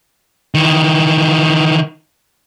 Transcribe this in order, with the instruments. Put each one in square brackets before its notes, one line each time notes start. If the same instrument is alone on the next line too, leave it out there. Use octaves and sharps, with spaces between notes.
[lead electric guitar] D#3 E3